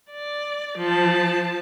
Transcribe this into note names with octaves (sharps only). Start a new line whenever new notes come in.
D5
F3 A5